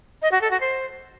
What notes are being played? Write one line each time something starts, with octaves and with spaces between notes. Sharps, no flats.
D#5
F#4
A4
F#4
C5